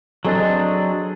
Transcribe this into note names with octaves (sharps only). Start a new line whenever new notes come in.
F#3 C4 D4 G#4 A4 D#5